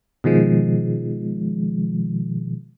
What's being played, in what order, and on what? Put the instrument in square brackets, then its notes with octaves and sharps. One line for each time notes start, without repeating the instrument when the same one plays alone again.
[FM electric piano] B2 D#3 F3 G#3